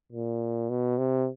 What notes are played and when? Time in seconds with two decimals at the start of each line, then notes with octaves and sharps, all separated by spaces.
0.12 A#2
0.70 B2
0.98 C3